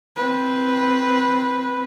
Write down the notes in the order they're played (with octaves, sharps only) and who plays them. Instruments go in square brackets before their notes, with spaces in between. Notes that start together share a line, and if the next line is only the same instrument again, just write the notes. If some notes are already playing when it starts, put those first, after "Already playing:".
[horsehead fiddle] C4 B4